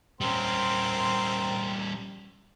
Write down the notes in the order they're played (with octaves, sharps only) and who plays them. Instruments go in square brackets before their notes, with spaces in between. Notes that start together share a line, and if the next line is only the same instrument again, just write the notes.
[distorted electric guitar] G3 C#4 [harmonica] C4 A#4 C6